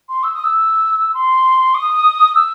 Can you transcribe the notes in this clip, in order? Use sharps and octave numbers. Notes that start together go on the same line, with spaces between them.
C6
E6
D#6
E6
C6
D#6
E6